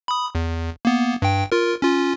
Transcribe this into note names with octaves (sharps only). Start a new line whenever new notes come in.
B5 D#6
E2
A#3 B3
G2 G5
F4 A#4
C#4 F4